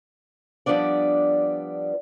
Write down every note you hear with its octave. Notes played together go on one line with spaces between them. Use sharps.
F3 G3 B3 D4 D5